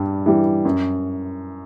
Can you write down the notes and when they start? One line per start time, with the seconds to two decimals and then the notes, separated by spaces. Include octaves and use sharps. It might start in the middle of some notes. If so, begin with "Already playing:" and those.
Already playing: G2 G3
0.26 E3 G3
0.65 F#2